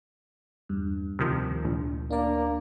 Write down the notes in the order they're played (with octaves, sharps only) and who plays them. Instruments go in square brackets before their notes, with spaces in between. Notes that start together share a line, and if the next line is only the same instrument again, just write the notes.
[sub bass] E2 [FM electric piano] G2
[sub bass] D2 [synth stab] C3 D#3 F3
[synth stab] A#1
[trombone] A#3 [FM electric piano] D4 D5